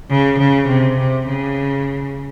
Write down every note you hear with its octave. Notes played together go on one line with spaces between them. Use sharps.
C#3
C#3
C3
C3
C#3